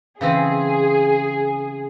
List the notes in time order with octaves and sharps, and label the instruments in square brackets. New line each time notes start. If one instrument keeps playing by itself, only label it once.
[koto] C#3 E3 C4 [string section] G#4